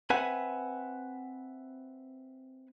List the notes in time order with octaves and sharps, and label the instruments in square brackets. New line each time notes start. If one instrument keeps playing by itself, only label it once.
[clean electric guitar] C4 B4 E5 F#5 G#5 B5